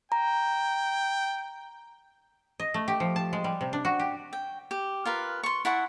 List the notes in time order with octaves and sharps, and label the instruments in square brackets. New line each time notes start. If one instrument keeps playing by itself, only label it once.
[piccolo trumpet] G5 [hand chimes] A#5
[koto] D#5
A3
G4
F3
A5
G#3
G3
C3
D4
F#4
G4
[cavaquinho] G5
G4
F4 A#4 B4
C6 C#6
E4 F#5 A5 C#6